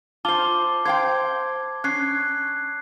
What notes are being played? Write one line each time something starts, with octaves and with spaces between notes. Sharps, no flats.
F4 C5 A5 D6 G7
C5 F5 G5 G#6
C#4 F#6 C7